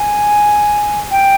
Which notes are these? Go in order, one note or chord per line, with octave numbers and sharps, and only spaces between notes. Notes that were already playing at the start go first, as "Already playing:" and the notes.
Already playing: G#5
G5